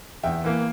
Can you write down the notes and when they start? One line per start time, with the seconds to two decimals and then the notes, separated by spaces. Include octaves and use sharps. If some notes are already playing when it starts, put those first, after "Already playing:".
0.23 E2 E5 G5
0.44 E3 A#3